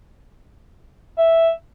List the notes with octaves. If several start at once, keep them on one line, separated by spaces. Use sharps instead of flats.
E5